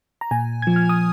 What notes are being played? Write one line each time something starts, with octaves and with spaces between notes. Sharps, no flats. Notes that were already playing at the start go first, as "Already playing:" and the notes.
A#5
A#2 G#5
F3 G#6
F6
D#6